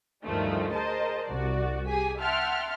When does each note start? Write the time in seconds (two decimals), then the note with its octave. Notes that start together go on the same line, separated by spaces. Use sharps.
0.23 D2 G2 D#3 F3 G#3 A3
0.73 G#4 A#4 C5 D#5 A5
1.26 C2 F#4 D5
1.86 G4 G#4 G#5 B6
2.20 E5 F#5 G5 A5 C6 F6